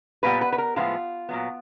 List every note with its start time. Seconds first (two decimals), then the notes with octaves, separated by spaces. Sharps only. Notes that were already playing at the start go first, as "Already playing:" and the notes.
0.23 A#2 G3 B3 B4
0.41 B4
0.52 B4
0.58 A#4
0.76 A2 F3 G#3 B3 F4
1.29 A#2 F#3 B3